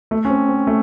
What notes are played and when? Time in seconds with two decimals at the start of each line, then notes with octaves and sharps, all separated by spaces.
0.11 A3
0.25 C#4
0.30 C4
0.49 C4
0.67 A3